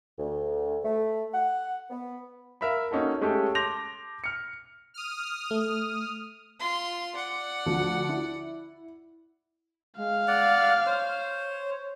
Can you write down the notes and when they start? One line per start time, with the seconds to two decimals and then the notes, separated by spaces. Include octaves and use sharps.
0.17 D2
0.84 A3
1.34 F#5
1.89 B3
2.61 A#4 E5 F5 B5
2.91 A#3 C#4 D#4 F#4 A4
3.21 G#3 A3 C#4 G4 A4
3.55 A5 C6 D6 G6 A#6 F7
4.24 F6 C#7
4.94 D#6 F6
5.51 A3
6.60 F4 C6
7.15 D5 F#5
7.66 D2 F3
8.09 E4
9.99 G#3 F5
10.28 D5 F#5
10.86 C5 C#5